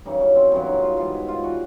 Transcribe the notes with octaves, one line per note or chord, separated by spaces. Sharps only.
F#2 C#3 E3 G3 D#4
C#4
C4
F#2 C#3 E3 G3 B3
D#4
F4
G#2 E3 G3 F4
E4
F4
E3 G3 F#4